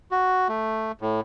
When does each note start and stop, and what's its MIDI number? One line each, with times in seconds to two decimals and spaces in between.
0.11 0.48 66
0.49 0.92 57
1.01 1.21 45